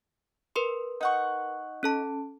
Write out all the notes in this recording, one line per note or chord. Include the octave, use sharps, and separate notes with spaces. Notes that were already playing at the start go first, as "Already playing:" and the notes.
A#4 B4 C6
D#4 F#5 C#6
C#4 A4 A5